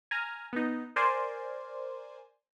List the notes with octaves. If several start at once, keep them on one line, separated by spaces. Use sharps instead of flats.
G#5 A#5 F6
B3 D#4
A#4 C5 D5 G#5 C6